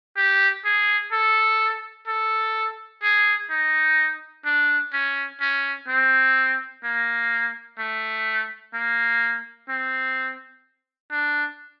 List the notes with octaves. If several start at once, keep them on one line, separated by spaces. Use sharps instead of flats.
G4
G#4
A4
A4
G#4
D#4
D4
C#4
C#4
C4
A#3
A3
A#3
C4
D4